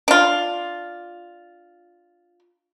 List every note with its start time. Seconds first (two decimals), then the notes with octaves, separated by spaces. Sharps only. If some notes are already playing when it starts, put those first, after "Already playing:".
0.08 D4 F4